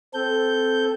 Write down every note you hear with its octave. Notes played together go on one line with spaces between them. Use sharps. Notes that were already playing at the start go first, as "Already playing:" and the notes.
C4 A4 G6